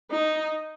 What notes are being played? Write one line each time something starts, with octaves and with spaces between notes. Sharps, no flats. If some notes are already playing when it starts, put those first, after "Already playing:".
D#4